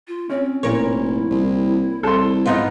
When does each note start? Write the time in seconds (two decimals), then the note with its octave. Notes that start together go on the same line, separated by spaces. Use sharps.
0.08 F4
0.30 C4 C#4
0.63 F1 A#2 E4 A#4 C#5
1.30 C2
2.03 C2 A4 C6
2.46 G#2 F3 B3 D#4 F4